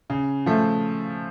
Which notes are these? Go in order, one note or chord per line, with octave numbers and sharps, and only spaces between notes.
C#3
F3 A3